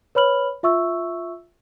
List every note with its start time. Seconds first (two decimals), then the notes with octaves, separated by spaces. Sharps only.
0.15 B4 C#5 B5 F6 F#7
0.63 F4 E5 C#6 E6